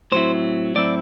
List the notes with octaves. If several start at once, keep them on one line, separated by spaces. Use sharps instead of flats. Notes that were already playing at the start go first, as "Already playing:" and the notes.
A2 F#3 C4 E4 C5
A2 F#3 C4 E4 D5